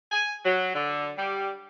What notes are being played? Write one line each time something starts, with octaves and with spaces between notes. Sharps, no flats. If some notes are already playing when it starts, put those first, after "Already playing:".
G#5
F#3
D3
G3